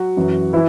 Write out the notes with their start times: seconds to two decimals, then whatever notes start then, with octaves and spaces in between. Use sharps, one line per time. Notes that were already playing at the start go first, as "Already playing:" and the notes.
Already playing: F#3 F#4
0.17 F#2 E3
0.53 E3 E4